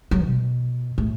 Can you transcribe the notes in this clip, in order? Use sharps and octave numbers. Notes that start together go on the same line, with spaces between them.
F#3
B2
A2